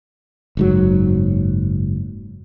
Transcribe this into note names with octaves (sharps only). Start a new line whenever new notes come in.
F#1 G#2 F#3